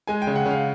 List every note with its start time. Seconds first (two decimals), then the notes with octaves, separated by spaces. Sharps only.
0.07 G#3 G#5
0.22 G5
0.27 C#3
0.35 F#5
0.46 C#3
0.51 F5